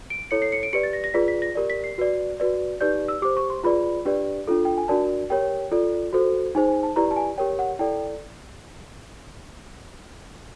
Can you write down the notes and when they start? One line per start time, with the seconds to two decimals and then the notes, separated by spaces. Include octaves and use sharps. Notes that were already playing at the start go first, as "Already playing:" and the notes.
0.10 D7
0.31 E4 A4 C#5 C#7
0.42 C7
0.52 C#7
0.63 D7
0.73 G4 B4 D5 C#7
0.83 A6
0.93 A#6
1.04 A#6
1.14 F4 G#4 B4 D5 B6
1.28 B6
1.42 A#6
1.55 G4 A#4 D5
1.70 B6
1.84 C7
1.98 F#4 B4 D5
2.40 F#4 B4 D5
2.81 D#4 G4 B4 D5 G6
3.08 E6
3.22 G4 D6
3.25 C5
3.37 C#6
3.50 C6
3.64 F4 G#4 B4 D5 B5
4.05 D4 G4 B4 D5
4.48 D4 F4 A4
4.65 G5
4.78 G#5
4.88 D4 F#4 A#4 D5 A5
5.30 G4 A#4 C#5 G5
5.72 F4 A4 D5
6.13 F#4 A4 C5
6.55 D#4 G#4 C5 G#5
6.69 G#5
6.83 A5
6.96 E4 G4 B4 D5 A#5
7.11 A5
7.16 G#5
7.38 G4 A#4 C#5 G5
7.59 F#5
7.79 E4 A4 D5 G5